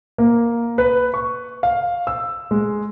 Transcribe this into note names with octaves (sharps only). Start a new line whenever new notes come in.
A#3
B4
C#6
F5
E6
G#3